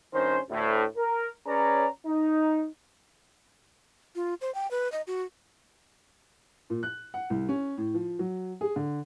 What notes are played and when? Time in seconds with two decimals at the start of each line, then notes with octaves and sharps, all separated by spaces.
0.13 G2 D#3 C#4 C5
0.50 D2 A2
0.97 A#4
1.47 C#4 G#4 B4 C#5 D5 A#5
2.06 D#4
4.15 F4
4.41 C5
4.55 G5
4.71 B4
4.92 D#5
5.07 F#4
6.70 A#2
6.83 F#6
7.14 F#5
7.30 C2
7.49 C#4
7.77 A2
7.94 F3
8.19 F#3
8.61 G#4
8.76 D3